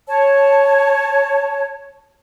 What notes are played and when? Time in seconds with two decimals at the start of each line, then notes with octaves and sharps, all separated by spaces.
0.07 C#5 A5